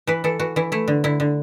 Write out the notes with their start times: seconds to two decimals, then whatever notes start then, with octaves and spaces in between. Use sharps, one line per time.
0.07 E3 B4
0.24 E3 A4
0.39 E3 F#4
0.56 E3 E4
0.72 A3 E4
0.88 D3
1.04 D3 E4
1.20 D3